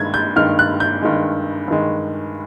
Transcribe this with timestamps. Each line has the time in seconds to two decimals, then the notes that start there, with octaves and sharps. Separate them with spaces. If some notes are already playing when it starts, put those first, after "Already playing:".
Already playing: G2 D#3 G#3 G#6
0.14 G6
0.36 G2 D#3 G#3 F6
0.59 F#6
0.80 G6
1.02 G2 D#3 G#3
1.68 G2 D#3 G#3